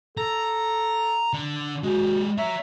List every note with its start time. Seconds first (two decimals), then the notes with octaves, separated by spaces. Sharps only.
0.17 A4 A#5
1.33 D3
1.83 G#3 F#4 G4
2.38 C#5 E5 A#5